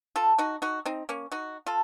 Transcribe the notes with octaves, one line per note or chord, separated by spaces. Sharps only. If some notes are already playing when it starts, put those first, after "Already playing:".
F4 A4
D#4 F#4
D#4 F#4
C4 D#4
A#3 C#4
D#4 F#4
F4 A4